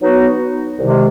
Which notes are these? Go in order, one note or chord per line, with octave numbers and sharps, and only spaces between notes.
F#3 B3 D#4 F#4 B4
C2 C3 D#3 G#3